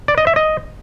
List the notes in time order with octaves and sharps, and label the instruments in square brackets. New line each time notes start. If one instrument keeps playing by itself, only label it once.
[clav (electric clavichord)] D5
D#5
E5
D#5